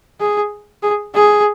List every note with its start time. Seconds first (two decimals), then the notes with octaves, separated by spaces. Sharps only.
0.20 G#4
0.83 G#4
1.14 G#4